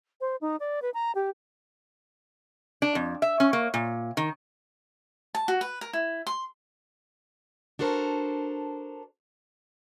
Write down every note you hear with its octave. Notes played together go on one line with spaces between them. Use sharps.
C5
D#4
D5
B4
A#5
G4
D4
F2
E5
C#4
A#3
A#2
D#3
A5
F#4
B4
A#4
E4
C6
D4 F#4 A4 A#4 C5